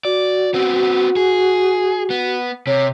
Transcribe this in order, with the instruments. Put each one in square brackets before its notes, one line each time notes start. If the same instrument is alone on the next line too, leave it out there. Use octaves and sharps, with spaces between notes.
[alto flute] F#4 [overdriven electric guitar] D5
[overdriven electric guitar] B3 C4
G#4
B3
[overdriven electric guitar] C3 [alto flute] C#5